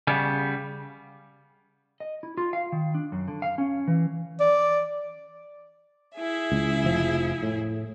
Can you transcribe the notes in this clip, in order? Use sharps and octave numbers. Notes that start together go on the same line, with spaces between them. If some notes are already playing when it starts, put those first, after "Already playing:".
C#3 G3 B3
D#5
E4
F4
F5
D#3
D4
F#2
D3
F5
C#4
E3
D5
E4 G#4 E5
C#2
F1 F3
A2